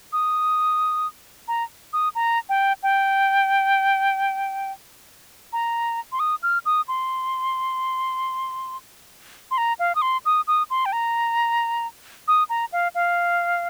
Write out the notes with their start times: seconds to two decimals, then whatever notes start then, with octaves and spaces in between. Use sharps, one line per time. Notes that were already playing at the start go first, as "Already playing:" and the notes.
0.13 D#6
1.48 A#5
1.93 D#6
2.15 A#5
2.49 G5
2.83 G5
5.53 A#5
6.12 C6
6.20 D#6
6.43 F6
6.66 D#6
6.88 C6
9.51 C6
9.58 A#5
9.79 F5
9.95 D#6
10.02 C6
10.26 D#6
10.47 D#6
10.70 C6
10.86 G5
10.93 A#5
12.28 D#6
12.50 A#5
12.72 F5
12.95 F5